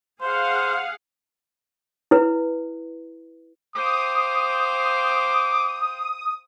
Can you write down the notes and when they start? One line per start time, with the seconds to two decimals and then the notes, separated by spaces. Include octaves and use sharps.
0.21 G#4 C5 F5 F#5
2.11 E4 B4
3.75 C5 F5 G5 D6 D#6